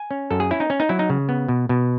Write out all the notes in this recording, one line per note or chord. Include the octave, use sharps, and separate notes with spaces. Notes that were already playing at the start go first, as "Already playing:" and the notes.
Already playing: G#5
C#4
F#2 A4
G#4
C#4 E4
D#4
C#4
D#4
F#3 E4
D#4
C#3
B3
B2
B2